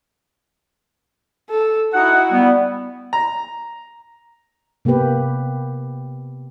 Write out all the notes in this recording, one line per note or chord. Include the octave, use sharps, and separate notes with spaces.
A4
D#4 E4 F#4 F#5
G3 B3
A#5
C3 A#3 B3 G4 B4